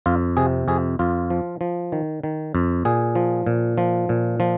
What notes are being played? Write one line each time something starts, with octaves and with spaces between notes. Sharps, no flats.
F2 F4
C3 G#4
F2 G#4
F2 F4
F3
F3
D#3
D#3
F2
A#2 G#4
F3
A#2
F3
A#2
F3